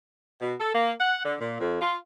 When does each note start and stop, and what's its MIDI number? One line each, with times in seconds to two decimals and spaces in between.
0.40 0.53 47
0.59 0.71 69
0.73 0.91 58
0.99 1.20 78
1.24 1.34 50
1.40 1.59 46
1.60 1.78 41
1.81 1.96 65